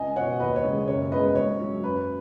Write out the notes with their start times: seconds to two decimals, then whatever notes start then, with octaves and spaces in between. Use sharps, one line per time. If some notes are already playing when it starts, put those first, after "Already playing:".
Already playing: C#2 D#5 G#5
0.16 B2 B3 C#5 F#5
0.40 D#2 B4 D#5
0.56 C#5
0.64 C#3 G#3
0.88 F#1 C#5
1.12 F#2 C#3 G#3 B3 B4 D#5
1.35 G#2 C#5
1.59 F#3 C#4
1.83 F#2 B4